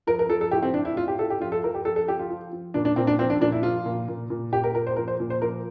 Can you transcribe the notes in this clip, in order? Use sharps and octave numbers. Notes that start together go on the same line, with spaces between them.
F3 A#4
A#4
F3 A4
A4
A2 G4
C4
A2 D4
E4
A2 F4
G4
A2 A4
G4
F3 F4
A4
F3 A#4
G4
F3 A4
A4
F3 G4
F4
F3
F3
A#2 D4
D4
A#2 C4
D4
F3 C4
D4
A#2 D4
E4
F3 F4
A#2
A#2
A#2
A#2 G4
A#4
A#2 A#4
C5
F3 A#4
C5
A#2
C5
F3 A#4